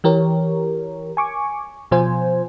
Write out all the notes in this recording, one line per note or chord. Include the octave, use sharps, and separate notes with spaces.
E3 G4 A#4 C#5
G#5 C#6 D6
B2 F3 F4 C5 G#5